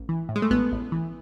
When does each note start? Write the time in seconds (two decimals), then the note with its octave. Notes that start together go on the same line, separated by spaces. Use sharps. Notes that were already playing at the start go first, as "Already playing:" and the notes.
Already playing: A1
0.09 E3
0.29 A2
0.36 G#3
0.42 A3
0.51 A1 B3
0.72 A1
0.92 E3